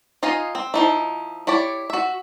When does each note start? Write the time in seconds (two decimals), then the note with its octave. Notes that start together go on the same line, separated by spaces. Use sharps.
0.23 D#4 F4 D#5 F5 G#5
0.55 C4
0.74 F3 D#4 E4
1.47 E4 G4 C#5 D5
1.90 F#4 E5